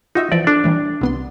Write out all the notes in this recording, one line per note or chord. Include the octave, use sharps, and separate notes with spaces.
D#4 F4 F#4 E5
E3 F3 D5 E5
D4 A4
A2 E3 G3
C2 B3 C6